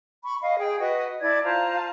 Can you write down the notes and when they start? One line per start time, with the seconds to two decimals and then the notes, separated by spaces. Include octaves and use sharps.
0.24 B5 C#6
0.42 D#5 F5
0.59 G#4 G5
0.80 F#4 B4 D#5
1.22 E4 D5 A5 G#6
1.44 F4 C5 A5 A#5